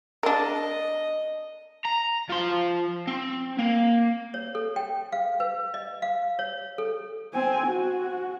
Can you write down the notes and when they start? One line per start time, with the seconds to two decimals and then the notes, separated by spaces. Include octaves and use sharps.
0.23 D4 A#4 D#5
1.85 A#5
2.30 F3 C6
3.07 C4
3.59 A#3
4.34 C#5
4.55 A4
4.76 G5
5.12 F5
5.40 B4
5.74 D#5
6.02 F5
6.39 C#5
6.78 A4
7.33 C4 G#5
7.67 F#4